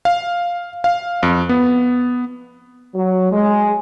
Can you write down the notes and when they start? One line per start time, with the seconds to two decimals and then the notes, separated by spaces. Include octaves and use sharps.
0.05 F5
0.84 F5
1.23 F2
1.49 B3
2.95 F#3
3.32 G#3